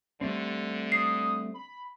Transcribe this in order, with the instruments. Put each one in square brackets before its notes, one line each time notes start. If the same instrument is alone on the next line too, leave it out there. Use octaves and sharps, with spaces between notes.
[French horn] D3 [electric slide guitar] G3 A3 C4
[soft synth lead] D#6 [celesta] C7
[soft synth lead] B5